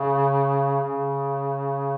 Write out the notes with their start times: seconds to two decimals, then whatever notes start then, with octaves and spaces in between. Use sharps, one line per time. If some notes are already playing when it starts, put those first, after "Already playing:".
Already playing: C#3
0.81 C#3